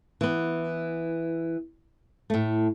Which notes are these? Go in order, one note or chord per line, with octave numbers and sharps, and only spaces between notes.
E3 B3
A2 A3